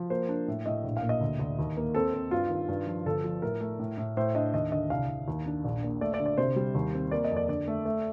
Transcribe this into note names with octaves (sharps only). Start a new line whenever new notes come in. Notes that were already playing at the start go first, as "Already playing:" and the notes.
Already playing: F3
A#3 C5
D4
A2
A2 D#5
A#1
F5
A#2
D#5
D2
D2
D#2
A#3
C4 A4
C4
G2 F4
D#3
G2
F3
G1 A4
F3
A2 A#4
A3
A2
A2
A2 C5
D4 D#5
D#2 D#5
D3 D#5
C2 F5
C2
D#2
D4
A#1
A#2
A3 D5
D5
D3
D5
C3 C5
G3
D#2
C4
A#3 D5
D#5
F2
D5
D3 D5
A3
A3